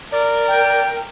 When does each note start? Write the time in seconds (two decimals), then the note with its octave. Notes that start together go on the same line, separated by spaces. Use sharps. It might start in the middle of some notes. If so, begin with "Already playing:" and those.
0.12 A#4 D5
0.47 G5